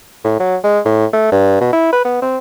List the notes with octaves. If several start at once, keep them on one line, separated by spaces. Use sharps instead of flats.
A2
F#3
G#3
A2
A3
G2
B2
E4
B4
B3
C4